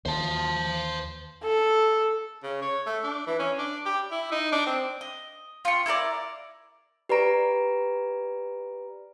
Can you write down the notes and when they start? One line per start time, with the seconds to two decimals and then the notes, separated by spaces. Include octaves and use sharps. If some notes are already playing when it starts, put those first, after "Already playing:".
0.06 D#2 C5 A5
1.43 A4
2.43 C#3
2.62 C#5
2.86 A3
3.03 D4
3.27 E3
3.39 C#4
3.58 D4
3.85 G4
4.11 E4
4.31 D#4
4.52 D4
4.66 C4
5.01 D#5
5.65 F4 C#6
5.86 E4 A4 A#4 D5
7.09 G4 B4 D5 A#5 D7